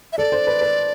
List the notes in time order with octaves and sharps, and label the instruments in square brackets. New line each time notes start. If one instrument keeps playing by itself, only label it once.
[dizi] E5
[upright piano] A4 [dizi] D5
[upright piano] C5
B4
B4